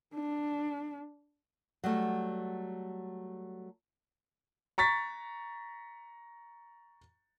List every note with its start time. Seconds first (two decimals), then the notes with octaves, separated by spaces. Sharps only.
0.14 D4
1.84 F#3 G3 A3
4.78 A#5 C#6 A6 B6